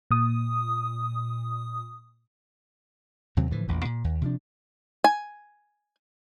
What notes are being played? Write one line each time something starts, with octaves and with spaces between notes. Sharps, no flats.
A#2 D#6
D#2 C3 F#3 C4
A2 D3 E3 F3
A1 E2 A#2
A#2
D#2
C3 F3 D4
G#5